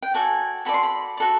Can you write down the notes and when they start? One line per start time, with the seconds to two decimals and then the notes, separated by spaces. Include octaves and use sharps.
0.02 G5
0.14 F#4 A4 D5 G#5
0.65 F#4 A4 D5 B5
0.74 C6
0.83 B5
1.17 F#4 A4 D5